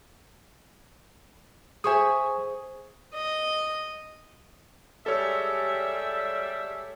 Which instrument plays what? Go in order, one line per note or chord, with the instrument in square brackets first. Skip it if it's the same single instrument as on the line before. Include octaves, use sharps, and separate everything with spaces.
[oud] G#4 C5 E5 [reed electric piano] G#5 C#6 D#6
[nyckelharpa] D#5
[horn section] G3 [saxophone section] G#3 G#4 E5 [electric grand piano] A4 C#5